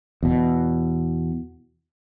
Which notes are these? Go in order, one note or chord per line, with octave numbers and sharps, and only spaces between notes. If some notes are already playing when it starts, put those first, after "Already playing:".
E2 B2